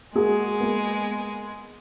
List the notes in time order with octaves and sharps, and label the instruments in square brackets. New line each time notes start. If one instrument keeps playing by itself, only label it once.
[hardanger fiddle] G#3 [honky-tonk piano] A#3 F#4 G#4
[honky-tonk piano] A#3 B3